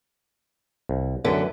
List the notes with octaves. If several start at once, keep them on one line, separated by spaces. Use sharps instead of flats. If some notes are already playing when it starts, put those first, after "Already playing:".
C2
F#2 D3 E3 B3